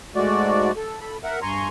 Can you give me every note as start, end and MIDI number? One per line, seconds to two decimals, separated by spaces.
0.15 0.71 44
0.15 0.71 56
0.15 0.71 57
0.15 0.71 66
0.15 0.71 74
0.76 0.99 69
1.01 1.17 69
1.01 1.17 83
1.24 1.40 70
1.24 1.40 76
1.24 1.40 78
1.42 1.69 43
1.42 1.69 80
1.42 1.69 82
1.42 1.69 84
1.42 1.69 85